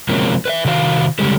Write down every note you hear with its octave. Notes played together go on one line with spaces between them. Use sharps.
C3 F3 F#3 G#3 A#3 C#4
B4 D#5 E5
C3 D#3 F#4 D5 F5
C#3 G3 G#3 G4 A4